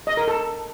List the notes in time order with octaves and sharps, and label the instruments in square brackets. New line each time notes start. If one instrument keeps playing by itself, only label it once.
[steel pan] D#5
A#4
A4